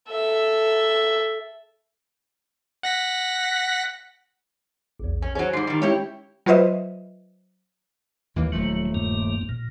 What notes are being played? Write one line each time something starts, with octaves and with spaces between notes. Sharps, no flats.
A4 E5
F#5 A#6 B6
A#1 E2
C#4
F#3 C#4 G#4 C5
G#2 G3 C7
D#3 G3
G#3 C#4 E4 G4 C#5
F#3 F4 B4 C5 D#5 E5
D#2 E3 A#3
D#1 F3 F#3 A3
G2 A#3
A#2